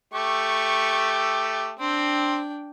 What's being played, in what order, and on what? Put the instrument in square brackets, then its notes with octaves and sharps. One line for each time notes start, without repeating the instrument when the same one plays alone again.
[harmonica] A3 G4 [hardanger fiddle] C#6
[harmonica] C4 [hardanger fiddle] D4 G5